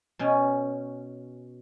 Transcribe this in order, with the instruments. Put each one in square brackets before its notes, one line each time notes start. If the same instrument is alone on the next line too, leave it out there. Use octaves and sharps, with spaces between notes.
[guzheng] B2 C#4